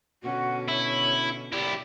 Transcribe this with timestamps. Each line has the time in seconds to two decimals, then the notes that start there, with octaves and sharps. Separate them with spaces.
0.23 B2 D3 C#4 F#4
0.68 E4 C#5
1.53 E4 G4 D5